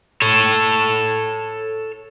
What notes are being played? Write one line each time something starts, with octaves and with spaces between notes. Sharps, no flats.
A4 C#5